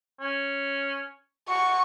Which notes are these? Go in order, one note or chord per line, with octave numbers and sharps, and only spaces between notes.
C#4
F#4 C#6